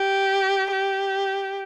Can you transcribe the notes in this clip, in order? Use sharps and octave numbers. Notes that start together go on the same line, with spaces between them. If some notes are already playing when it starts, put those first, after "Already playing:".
Already playing: G4
G4